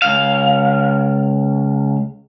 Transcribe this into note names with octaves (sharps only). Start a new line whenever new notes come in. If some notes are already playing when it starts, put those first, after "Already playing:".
C#2 F5